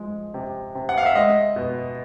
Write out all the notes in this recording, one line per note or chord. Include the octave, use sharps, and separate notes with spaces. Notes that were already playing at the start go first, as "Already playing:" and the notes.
Already playing: F3 G#3
C3
C3
F#5
F5
E5
G#3 D#5
B2